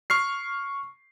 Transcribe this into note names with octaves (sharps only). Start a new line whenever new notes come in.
C#6 F6 C7